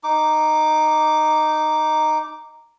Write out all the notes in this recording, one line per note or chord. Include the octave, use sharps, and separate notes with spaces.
D#4 D6